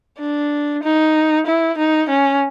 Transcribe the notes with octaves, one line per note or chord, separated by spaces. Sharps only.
D4
D#4
E4
D#4
C#4